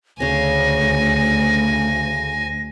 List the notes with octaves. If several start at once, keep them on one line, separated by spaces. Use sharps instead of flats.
D2 C#3 C#4 G#5 A#6